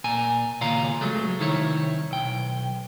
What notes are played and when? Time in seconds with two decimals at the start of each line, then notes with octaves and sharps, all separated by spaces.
0.04 A#2 G#5 A#5
0.61 D#2 A#2 C#3 F5 G#5 A#5
1.01 C#2 F#3 G#3 A3
1.39 C2 D#3 E4 C#5
2.11 B1 G5